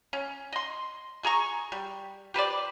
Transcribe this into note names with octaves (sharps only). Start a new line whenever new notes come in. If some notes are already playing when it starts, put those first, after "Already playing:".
C#4
D#5 C6
A3 G#4 A#5 C#6
G3
G4 B4 C5 D5